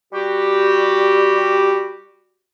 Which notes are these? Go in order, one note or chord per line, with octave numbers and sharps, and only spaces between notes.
G3 F#4 G4